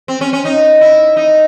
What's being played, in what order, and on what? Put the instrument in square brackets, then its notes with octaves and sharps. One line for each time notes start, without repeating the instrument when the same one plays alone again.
[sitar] C4
C#4
C#4
D#4
E4
D#4